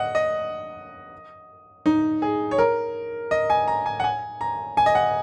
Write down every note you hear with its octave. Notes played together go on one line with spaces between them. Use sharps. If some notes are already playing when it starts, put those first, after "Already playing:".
Already playing: D#5 F#5
D#5
D#4
G#4
C#5
A#4
D#5
G#5
A#5
G#5
F#5
G#5
A#5
G#5
D#5
F#5